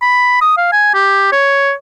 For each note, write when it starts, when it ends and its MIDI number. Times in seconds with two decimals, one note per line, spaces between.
0.02 0.39 83
0.42 0.53 87
0.58 0.71 77
0.72 0.91 80
0.94 1.30 67
1.32 1.72 73